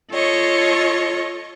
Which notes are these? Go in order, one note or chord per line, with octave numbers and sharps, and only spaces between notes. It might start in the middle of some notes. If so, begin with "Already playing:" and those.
F4 A4 C#5 D#5 C#6